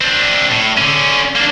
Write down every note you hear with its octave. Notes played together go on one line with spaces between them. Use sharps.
C4 D4
A2
D3 C#4
A#3 D4